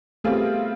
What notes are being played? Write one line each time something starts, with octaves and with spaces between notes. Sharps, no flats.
G3 A3 B3 C4 F4 G#4